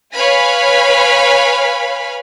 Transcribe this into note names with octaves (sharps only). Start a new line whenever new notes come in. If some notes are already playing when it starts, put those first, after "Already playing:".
B4 C#5 F5 G#5 B5 F6